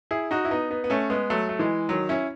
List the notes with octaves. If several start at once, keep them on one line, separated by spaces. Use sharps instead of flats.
E4 G#4
D#4 F#4
E4
B3 D#4
B3 D#4
B3
A3 C#4
G#3 B3
F#3 A3
A3
E3 G#3
D#3 F#3
C#4 E4